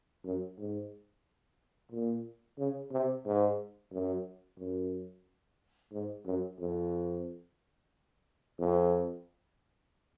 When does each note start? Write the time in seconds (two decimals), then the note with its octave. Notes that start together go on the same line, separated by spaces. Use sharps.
0.25 F#2
0.58 G#2
1.92 A#2
2.58 C#3
2.92 C3
3.25 G#2
3.92 F#2
4.59 F#2
5.92 G#2
6.26 F#2
6.59 F2
8.59 F2